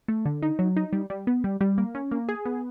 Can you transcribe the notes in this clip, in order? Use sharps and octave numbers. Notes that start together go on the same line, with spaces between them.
A3
D3
D#4
F#3
D#4
G3
G3
B3
G3
G3
A#3
C#4
A#3
G#4
B3